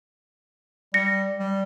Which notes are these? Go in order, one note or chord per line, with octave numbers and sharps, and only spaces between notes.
G3 A#6 C#7
G3